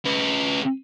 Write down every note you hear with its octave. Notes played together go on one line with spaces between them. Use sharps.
C#3 B4